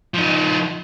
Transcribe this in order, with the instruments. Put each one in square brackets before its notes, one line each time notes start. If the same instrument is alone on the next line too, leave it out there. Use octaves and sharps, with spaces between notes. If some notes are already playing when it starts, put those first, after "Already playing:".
[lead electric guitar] F3 D#4